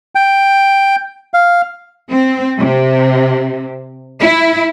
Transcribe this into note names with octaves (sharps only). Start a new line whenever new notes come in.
G5
F5
C4
C3
E4